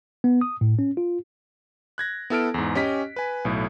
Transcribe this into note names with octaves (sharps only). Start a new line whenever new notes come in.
B3
D#6
A2
C#4
F4
F#6 G#6 A#6
B3 E4 A4 A5 F6 D7
E2 G#2
C#4 G4 D#5 B6
B4 G#5
B1 A2